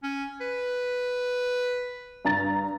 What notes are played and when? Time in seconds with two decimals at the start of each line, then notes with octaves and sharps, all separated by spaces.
0.03 C#4
0.40 B4
2.25 G2 A#5 A6